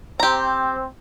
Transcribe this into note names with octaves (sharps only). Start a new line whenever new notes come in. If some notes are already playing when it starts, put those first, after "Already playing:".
C4 G4 A#5